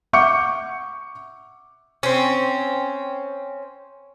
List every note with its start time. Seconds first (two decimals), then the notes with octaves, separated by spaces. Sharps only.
0.13 E5 F#5 C#6 D6 G6 C#7
2.03 C4 C#4